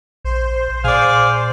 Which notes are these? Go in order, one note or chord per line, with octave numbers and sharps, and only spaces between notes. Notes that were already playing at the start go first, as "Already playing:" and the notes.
A#1 C5
A#2 G#4 D5 F5